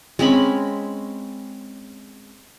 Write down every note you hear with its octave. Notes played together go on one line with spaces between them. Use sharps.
G#3 C4 C#4 B5